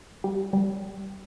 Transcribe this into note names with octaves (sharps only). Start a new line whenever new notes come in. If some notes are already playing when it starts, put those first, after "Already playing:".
G3
G3